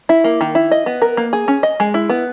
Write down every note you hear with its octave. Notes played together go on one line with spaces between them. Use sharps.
E4
A#3
D#3
E4
D#5
B3
A#4
A#3
G#4
C#4
D#5
G#3
E4
B3